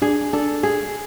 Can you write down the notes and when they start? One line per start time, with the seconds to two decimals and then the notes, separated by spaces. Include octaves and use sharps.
0.02 D4 G#4
0.33 D4 A4
0.63 G#4